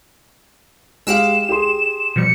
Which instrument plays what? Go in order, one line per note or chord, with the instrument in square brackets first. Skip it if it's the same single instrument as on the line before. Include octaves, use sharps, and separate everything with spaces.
[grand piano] G#3 G4 F5 [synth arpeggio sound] E6 F#6 D7 [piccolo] E7
[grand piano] G4 G#4 C6
[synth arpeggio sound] B2 F3 G3 [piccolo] C#7